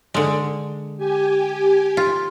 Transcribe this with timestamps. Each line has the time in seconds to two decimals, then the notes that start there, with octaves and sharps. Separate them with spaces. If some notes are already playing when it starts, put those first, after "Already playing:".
0.14 D3 G#3
0.97 G4 G#5
1.97 F4